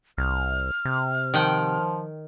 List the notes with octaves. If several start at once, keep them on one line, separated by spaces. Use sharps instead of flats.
C2 F6
C3
D#3 F3 F#5 G5